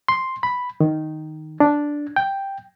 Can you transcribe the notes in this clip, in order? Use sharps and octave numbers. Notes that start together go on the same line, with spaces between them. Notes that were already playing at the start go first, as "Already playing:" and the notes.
C6
B5
D#3
D4
G5